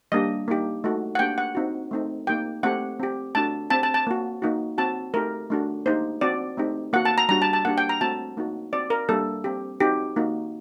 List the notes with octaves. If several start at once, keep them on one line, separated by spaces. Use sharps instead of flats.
G3 A#3 D4 G4 D#5
A#3 D#4 G4
A3 D#4 F#4
F#5
A#3 D4 G4 G5
F#5
C4 D#4 F#4
A3 C4 D#4
A#3 D#4 G4 G5
A3 C4 G4 F#5
C4 G4
A3 D4 F#4 A5
C4 G4 A5
A5
A5
A#3 F#4
A#3 D#4 F#4
C4 F#4 A5
A3 D#4 G4 A#4
A3 D4 F#4
A#3 D#4 G4 C5
C4 F#4 D5
A3 C4 D#4 G4
A#3 F#4 F#5
A5
A#5
G3 D4 F#4 A#5
A5
A5
A#3 D4 G4 F#5
G5
A#5
A3 C4 F#4 A5
A#3 D#4 F#4
C4 F#4 D5
A#4
G3 A#3 D4 G4 A4
C4 G4
C4 D#4 F#4 G4
A#3 D#4 F#4